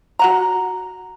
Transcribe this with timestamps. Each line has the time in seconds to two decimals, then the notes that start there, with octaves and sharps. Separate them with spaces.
0.19 F#4 F#5 A#5